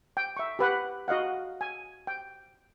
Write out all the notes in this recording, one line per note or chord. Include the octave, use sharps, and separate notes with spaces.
G5
E5 C#6
G4 B4 F#5
F#4 D#5 F5 F#5
G#5
G5